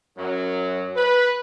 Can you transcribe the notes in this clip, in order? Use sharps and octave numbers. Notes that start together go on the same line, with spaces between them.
F#2 F#3
B4